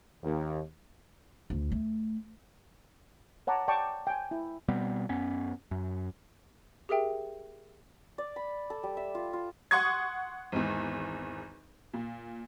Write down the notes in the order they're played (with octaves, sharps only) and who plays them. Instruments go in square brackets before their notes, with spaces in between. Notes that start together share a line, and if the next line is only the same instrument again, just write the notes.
[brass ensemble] D#2
[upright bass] D2
A3
[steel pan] C#5 F#5 A5 A#5 D6
D5 G5 A5 C#6 D6
G5 G#5
E4
[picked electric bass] B2 G3 B3 C4
F#2 B3 C#4
F#2
[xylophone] G4 G#4 A#4 E5 G5
[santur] D5
B5
A4
G3
E5
F4
F4
[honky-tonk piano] F#5 C6 C#6 D#6 G#6
G#1 E2
A#2